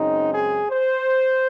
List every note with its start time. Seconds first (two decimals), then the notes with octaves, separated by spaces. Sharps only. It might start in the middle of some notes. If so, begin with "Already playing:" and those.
Already playing: F#2 C#3 G#3 C4 D#4
0.32 G#4
0.70 C5